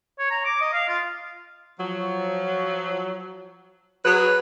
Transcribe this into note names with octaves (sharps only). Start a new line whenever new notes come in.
C#5
A#5
D6
D#5
F5
F4
F3 F#3
F#3 G#4 B4